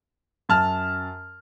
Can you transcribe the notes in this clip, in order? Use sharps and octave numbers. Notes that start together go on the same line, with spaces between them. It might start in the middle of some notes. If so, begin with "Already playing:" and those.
F#2 A5 F6